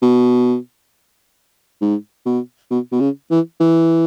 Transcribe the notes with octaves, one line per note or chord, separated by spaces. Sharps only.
B2
G#2
B2
B2
B2
C#3
E3
E3